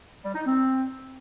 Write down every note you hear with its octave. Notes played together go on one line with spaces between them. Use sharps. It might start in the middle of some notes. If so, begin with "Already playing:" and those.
G3
D#4
C4